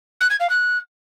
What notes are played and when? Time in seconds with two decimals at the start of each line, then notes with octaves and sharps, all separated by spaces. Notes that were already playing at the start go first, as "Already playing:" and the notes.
0.20 F#6
0.30 G#6
0.40 F5
0.49 F#6